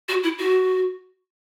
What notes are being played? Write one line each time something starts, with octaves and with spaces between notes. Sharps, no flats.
F#4
E4
F#4